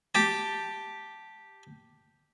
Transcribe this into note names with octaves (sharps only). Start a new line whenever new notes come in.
G4 A5